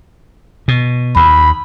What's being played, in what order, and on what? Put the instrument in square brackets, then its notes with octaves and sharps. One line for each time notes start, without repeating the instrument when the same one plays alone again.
[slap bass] B2
[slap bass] D#2 [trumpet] B5